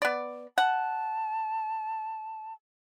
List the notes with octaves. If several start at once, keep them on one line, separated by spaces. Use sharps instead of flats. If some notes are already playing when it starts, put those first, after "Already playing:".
B3 D5
F#5 A5